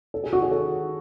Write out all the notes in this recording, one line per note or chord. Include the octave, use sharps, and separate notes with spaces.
A4
G#4
F#4
G#4
A4